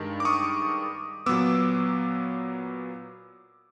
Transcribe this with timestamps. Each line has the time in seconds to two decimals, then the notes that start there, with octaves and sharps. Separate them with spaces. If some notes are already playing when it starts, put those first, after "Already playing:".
Already playing: G2 D#3 G#3
0.20 D6
0.25 C#6 D#6
1.26 A#2 F#3 B3 D6 E6